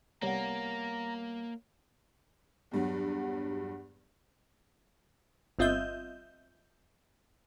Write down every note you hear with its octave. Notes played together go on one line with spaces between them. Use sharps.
C2 G3 A#3 B3 C#5 F#5 A#5
E2 G2 F#3
G1 C4 F4 D#5 E5 G6